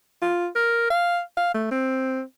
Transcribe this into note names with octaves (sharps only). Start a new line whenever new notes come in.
F4
A#4
F5
F5
A3
C4